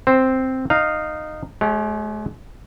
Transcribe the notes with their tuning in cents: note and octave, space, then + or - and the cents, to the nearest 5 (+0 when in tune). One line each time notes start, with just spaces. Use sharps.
C4 +0 C5 +0
D#4 -15 F5 +0
G#3 +45 G4 +0 C#5 +10